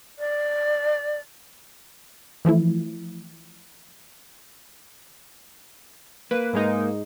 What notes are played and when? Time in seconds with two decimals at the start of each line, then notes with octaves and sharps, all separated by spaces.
0.18 D5
2.45 E3 F3 A3 E4
6.31 A#3 B4
6.53 G#2 G#3 D#4